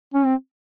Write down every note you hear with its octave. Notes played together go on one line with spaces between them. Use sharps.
C#4
C4